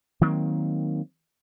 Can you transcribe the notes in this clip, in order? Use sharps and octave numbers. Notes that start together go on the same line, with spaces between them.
D#3 F#3 A#3 C4